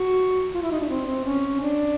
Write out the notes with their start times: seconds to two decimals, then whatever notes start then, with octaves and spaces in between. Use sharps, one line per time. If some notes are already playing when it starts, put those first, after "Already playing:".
Already playing: F#4
0.55 F4
0.63 E4
0.72 D#4
0.80 D4
0.89 C4
1.07 C4
1.25 C#4
1.60 D4